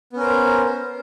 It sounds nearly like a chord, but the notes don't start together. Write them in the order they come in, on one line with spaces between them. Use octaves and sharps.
B3 C#4 A#4 C5